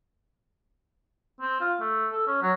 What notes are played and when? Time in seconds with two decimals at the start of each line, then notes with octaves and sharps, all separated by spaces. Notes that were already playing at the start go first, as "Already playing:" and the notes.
1.40 C4
1.61 F4
1.80 A3
2.12 A4
2.27 C#4
2.42 F#3